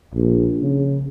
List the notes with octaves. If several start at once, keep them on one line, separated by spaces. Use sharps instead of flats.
A#1
C#3